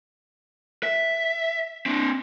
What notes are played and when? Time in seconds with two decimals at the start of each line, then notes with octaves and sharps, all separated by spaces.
0.83 E5
1.86 C4 D4